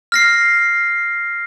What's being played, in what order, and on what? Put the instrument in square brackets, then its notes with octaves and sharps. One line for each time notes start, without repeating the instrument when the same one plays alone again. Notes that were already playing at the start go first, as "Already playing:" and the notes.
[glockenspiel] F6 A#6 C7